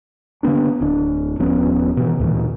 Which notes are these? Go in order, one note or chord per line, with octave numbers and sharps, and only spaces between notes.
D3 A#3 B3 D4
D1 D4
D#1 F3 B3 C#4
B2 D#3 E3
D2 A#2 D#3 E3